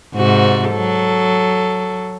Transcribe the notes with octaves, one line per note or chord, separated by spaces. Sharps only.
G#2 C3 F#4
F#3 A4